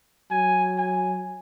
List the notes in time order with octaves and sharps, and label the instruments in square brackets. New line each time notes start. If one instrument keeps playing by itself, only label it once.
[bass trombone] F#3 [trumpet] G#5
[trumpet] G#5